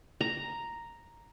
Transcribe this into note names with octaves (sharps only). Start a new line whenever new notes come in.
A#5